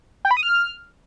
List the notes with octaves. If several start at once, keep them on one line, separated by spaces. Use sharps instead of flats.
G5
B5
D#6
F6